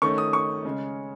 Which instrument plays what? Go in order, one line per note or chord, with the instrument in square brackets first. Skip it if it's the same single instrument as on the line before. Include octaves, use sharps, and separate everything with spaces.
[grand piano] D#3 A3 C#4 C#6
D#6
C#6
C#3 G#3 C#4